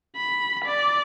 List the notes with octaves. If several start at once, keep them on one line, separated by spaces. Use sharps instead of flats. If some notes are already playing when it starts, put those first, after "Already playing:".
B5
D5